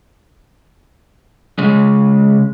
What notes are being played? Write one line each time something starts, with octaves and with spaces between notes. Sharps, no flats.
C#3 G#3